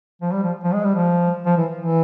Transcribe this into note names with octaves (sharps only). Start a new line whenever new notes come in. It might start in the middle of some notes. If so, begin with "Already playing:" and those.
F3
G3
F3
F3
G#3
G3
F3
F3
E3
E3